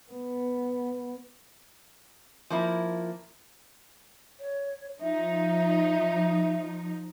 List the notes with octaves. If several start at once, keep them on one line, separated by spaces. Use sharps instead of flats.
B3
F3 A#3 E4
C#5
F3 D#4 E5